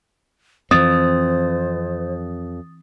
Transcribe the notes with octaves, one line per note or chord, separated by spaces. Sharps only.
F2 E3 C4 C5 D#6 A6